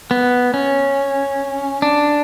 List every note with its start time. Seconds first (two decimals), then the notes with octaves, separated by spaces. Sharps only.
0.11 B3
0.54 C#4
1.82 D4